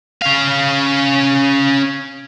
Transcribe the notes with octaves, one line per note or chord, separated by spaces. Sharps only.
C#4 F5